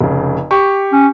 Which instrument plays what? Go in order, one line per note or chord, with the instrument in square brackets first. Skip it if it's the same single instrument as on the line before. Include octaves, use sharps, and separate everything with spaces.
[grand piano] F1 C#3
G4 C#6
[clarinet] C#4